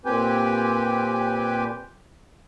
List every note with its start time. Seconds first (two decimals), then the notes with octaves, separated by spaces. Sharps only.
0.05 A#2 C4 G4 B4 G5 G#5